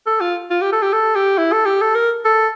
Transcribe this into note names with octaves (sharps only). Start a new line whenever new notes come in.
A4
F4
F4
G4
A4
G4
A4
G4
E4
A4
G4
A4
A#4
A4